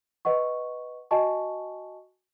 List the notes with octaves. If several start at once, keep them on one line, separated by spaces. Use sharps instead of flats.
B4 D#5 F#5 C#6
F#4 D#5 G#5 A5 C#6